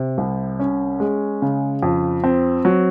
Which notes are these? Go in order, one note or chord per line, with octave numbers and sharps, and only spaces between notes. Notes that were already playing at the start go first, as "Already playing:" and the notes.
Already playing: C3
C2
C#4
G#3
C#3
F2
C4
F#3